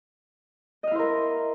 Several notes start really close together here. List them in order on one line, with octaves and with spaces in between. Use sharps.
D#5 F5 E4 C5 A#4